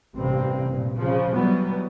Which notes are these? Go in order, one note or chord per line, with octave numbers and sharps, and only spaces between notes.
A1 G2 C3 A#3 C4
G2 A#2
A#2 C#3 F3
E3 F#3 G3 B3